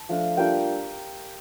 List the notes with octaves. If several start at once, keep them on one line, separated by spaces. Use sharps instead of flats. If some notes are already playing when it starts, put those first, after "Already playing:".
Already playing: A5
F3 A3 D4 F4
G3 A#3 D4 F4 G5